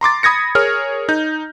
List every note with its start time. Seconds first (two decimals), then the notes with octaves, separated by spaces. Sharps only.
0.01 A#5 C6 D6 A6
0.23 B5 D#6 G#6 A#6 C#7
0.55 G#4 A#4 C#5 F6
1.09 D#4 G6